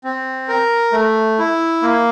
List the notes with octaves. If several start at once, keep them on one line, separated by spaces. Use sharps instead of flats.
C4
A#4
A3
E4
A#3